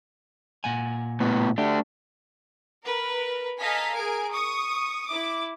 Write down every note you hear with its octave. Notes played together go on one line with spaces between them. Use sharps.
A#2 F#5 G#5
A2 B3
A3 D4 G4
A#4 B4
A4 D#5 F5 G#5 A#5 B6
G#4 A#4 G#5 D7
C#6 D#6
E4 D6